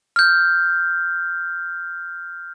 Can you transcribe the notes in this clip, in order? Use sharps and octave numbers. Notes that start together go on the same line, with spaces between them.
F6 G6